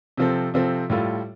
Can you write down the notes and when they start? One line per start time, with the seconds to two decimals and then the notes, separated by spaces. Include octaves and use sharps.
0.17 C3 F3 C4 A4
0.54 C3 F3 C4 A4
0.90 A2 G3 F4 A4